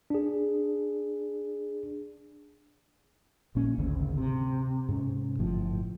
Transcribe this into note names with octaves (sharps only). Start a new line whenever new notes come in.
D4 G#4
A#1 A#2 C#4
G#1 D2 C#3
C3
G#2 C3 C#4
G1 A2 F3